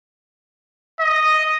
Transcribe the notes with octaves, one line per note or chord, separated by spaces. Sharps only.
D#5